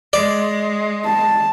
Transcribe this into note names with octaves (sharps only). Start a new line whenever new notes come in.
G#3 D5
A5